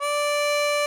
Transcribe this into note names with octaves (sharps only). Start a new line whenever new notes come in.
D5